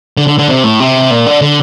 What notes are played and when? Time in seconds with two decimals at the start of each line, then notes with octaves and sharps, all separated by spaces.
0.17 D3
0.28 D3
0.39 D3
0.49 C3
0.64 A2
0.80 C3
1.11 A#2
1.26 D3
1.42 D3